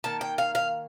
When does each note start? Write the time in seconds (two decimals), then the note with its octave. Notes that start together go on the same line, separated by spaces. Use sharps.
0.04 D#3 A#3 A5
0.21 G5
0.38 F5
0.55 F5